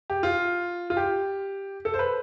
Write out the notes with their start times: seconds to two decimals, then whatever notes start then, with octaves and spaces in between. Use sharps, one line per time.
0.10 G4
0.23 F4
0.90 F4
0.97 G4
1.85 A4
1.94 C5
1.99 B4